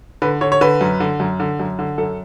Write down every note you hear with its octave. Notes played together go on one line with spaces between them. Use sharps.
D3 B4
D3 C#5
C#5
D3 B4
F#2
D3
F#2
D3
F#2
D3
F#2 A4